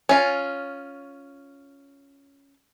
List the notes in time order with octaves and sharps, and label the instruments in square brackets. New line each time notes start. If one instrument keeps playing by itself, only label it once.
[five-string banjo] C#4 F4